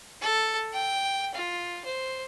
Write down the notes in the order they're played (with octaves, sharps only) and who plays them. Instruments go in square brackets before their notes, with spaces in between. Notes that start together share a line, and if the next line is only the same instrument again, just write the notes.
[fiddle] A4
G5
F4
C5